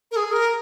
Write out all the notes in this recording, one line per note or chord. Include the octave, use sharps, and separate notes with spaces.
A#4
G#4
A#4